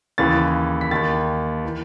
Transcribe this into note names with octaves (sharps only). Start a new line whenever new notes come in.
D#2 C#3 E3 A6
B6
D#2 D#3 A6
E3